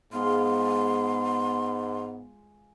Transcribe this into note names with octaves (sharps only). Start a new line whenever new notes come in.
G#2 G#3 B3 F4 C6